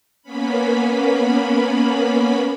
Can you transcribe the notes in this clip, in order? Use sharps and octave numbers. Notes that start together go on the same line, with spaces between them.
A#3 B3 C#4 B5